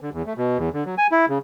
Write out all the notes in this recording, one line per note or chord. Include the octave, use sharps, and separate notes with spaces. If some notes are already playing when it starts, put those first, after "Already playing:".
D3
E2
A3
B2
E2
D3
F#3
G#5
E4
C#3